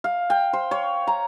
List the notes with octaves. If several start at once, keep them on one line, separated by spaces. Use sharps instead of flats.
F5
G5
C5
C#5
A#5